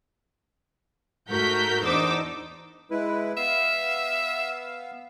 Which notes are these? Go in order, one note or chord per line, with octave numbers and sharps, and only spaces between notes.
G#2 A3 F#4 A#4 G6 B6
E2 D4 D#4 C5 D6 E6
G#3 E4 B4
B3 E5 F5